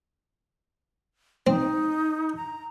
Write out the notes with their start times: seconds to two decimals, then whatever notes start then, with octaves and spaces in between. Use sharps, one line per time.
1.47 C4 D#4
2.37 A#5